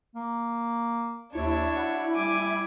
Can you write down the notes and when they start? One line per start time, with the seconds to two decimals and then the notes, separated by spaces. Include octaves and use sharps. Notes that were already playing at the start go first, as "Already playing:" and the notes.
0.15 A#3
1.35 D#2 D4 E4 C#5
1.74 F#4
2.15 G3 G#5 D6